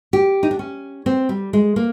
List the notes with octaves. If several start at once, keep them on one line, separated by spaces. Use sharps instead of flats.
G4
D#4
D4
C#4
C4
G3
G#3
A#3